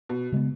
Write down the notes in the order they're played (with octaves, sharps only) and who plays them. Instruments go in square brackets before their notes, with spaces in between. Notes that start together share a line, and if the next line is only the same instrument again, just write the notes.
[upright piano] B2
[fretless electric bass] C#3 G#3 B3